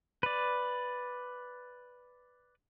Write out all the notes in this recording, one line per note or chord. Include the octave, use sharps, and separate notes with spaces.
B4 D5